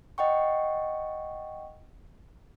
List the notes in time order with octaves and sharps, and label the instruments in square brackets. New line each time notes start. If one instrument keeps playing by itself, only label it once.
[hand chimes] D#5 F#5 G5 C#6